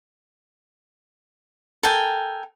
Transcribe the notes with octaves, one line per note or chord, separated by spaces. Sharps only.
A4 A#4 G5 G#5